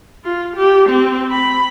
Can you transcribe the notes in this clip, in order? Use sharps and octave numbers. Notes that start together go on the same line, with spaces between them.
F4
G4
C4
B5